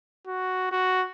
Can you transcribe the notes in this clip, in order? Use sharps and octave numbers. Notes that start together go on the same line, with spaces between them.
F#4
F#4